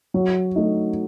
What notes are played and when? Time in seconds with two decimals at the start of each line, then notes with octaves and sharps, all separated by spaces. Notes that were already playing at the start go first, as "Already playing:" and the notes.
0.14 F#3
0.56 A3 D#4